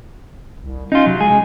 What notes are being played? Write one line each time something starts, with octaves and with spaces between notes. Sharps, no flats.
C2
C#4 D#4 F4
C3 F#3
G#3 G#4